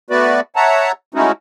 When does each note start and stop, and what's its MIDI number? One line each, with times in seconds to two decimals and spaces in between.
0.10 0.40 57
0.10 0.40 59
0.10 0.40 66
0.10 0.40 71
0.10 0.40 74
0.56 0.92 73
0.56 0.92 76
0.56 0.92 78
0.56 0.92 81
0.56 0.92 82
1.14 1.32 56
1.14 1.32 57
1.14 1.32 61
1.14 1.32 63
1.14 1.32 64
1.14 1.32 66